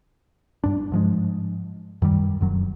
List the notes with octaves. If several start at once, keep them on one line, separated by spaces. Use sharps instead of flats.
G2 D4
G#2 F3 G#3
F#2 D#3 G3
F1 F#2 F#3